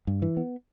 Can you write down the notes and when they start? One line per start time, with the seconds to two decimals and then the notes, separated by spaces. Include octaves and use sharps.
0.07 G2
0.22 E3
0.37 B3